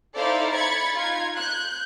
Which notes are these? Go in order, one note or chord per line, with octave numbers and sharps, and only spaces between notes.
D#4 E4 A4 C5 D5 F5
B5 G#6 A6 C#7
D#4 F4 G#6
F#6 G6